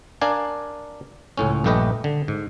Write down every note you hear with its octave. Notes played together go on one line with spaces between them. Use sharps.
D4 A#4 D5 F5 G#5
C#2 A2 C#4
A#1 G2 A3 G4 B4 D#5
D3
G#2